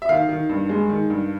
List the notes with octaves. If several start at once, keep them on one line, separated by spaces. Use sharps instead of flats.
E5
D#3 F5
D#3
G2
G#3
D#3
G2